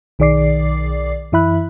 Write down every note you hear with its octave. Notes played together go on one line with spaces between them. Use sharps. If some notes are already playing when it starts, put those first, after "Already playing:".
B1 D#3 G#4 D5 D6 C7
F#2 E3 E4 E5 B5 F#6